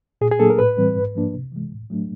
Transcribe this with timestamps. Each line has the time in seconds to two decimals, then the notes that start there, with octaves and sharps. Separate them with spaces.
0.21 A#2 G#4
0.31 G#4
0.40 F#3 A#3 D4 A4
0.50 A#4
0.59 A2 B4
0.77 E3 G3 C4
0.96 G#2
1.15 F3 A#3 D4
1.34 C3
1.52 E3 G#3
1.72 A2
1.90 F#3 A3 D4